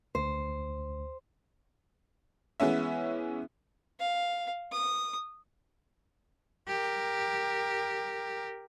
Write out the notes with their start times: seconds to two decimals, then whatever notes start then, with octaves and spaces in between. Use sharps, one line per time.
0.15 D2 C5
2.60 E3 G#3 B3 C#4 E5
4.00 F5
4.72 D#6
6.68 G4 A#4